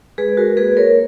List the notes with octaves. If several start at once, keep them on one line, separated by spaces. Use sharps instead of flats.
G#3 G#4 B4
G#3 F#4 A#4
A#3 G#4 B4
A#3 A#4 C#5